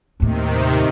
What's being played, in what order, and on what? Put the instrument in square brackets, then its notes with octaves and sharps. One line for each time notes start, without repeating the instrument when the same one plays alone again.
[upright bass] D#2 A2 [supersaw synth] C3 D#3